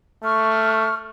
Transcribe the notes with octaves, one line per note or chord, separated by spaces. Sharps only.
A3 C#6 F6